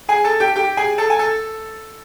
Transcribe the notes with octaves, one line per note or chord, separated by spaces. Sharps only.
G#4 G#5
A4 A5
G4 G5
G4 G5
G#4 G#5
A4 A5
G#5
A4 A5